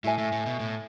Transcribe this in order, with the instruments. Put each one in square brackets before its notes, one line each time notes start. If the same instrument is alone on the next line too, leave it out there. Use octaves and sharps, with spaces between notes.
[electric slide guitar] A2 [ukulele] E4 A4 E5 G#5
[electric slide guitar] A2
A2
B2
A2